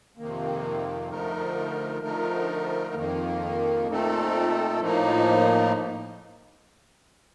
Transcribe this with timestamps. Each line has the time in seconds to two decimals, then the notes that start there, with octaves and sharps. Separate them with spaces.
0.17 F2 C3 D#3 A#3
1.10 D3 F3 A3 D#4 A#4
2.02 D3 F3 A3 D#4 A#4
2.95 F2 D#3 A#3
3.88 A#2 A3 C4 D#4 A4
4.80 A2 F3 A#3 D#4